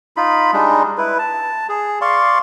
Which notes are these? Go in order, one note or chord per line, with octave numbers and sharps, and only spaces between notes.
D#4 F4 B5
G3 G#3 D4 D#4
E4 B4
A5
G#4
D5 F5 C6 C#6